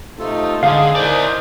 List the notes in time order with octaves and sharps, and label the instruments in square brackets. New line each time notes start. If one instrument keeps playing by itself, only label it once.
[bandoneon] C3 F4 A4 [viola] A3 D#4
[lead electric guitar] D3 [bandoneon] G#3 [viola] D#4 G#4 [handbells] F5
[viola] D#4 A#4 [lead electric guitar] E4 D5 [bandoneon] C5